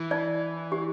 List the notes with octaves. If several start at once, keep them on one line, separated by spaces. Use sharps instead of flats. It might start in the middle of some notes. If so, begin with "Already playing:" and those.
Already playing: E3
D5
G4